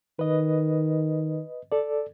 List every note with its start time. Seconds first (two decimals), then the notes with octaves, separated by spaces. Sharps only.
0.19 D#3 B4 D#5
1.72 A4 D5